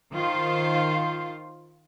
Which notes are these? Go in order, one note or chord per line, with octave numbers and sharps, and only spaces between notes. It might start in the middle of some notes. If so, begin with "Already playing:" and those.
D#3 F4 C5